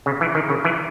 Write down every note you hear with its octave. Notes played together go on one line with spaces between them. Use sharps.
C#3
E3
D#3
C#3
E3